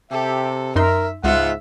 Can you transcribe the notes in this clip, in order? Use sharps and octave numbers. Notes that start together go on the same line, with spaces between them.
C3 G4 A4 E5
F#2 D#4 A#4 E5 C6
C#2 G#2 B3 F4 E5 F#5